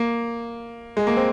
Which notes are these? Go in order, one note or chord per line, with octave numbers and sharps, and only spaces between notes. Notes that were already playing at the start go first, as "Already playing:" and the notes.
Already playing: A#3
G#3
A#3
C4